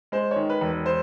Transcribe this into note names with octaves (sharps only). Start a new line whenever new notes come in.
G#3 C5
C#5
D#3
B4
E1
C5